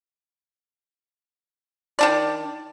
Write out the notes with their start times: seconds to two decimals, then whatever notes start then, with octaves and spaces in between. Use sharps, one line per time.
1.99 D#3 D4 D5